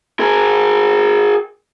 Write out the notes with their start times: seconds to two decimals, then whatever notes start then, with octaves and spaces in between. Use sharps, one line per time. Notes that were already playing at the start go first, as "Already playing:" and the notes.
0.20 G#4 A#4